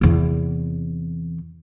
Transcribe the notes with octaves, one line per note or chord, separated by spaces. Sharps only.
E2 C3